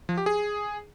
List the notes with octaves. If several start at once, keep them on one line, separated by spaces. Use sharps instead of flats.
F3
G4
G#4